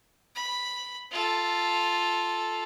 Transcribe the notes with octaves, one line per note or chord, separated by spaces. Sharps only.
B5
F4 A4